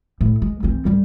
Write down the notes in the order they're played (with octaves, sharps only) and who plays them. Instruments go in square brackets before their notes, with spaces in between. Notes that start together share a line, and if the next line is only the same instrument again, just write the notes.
[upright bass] A2
G#3
E3 C4
D3 G3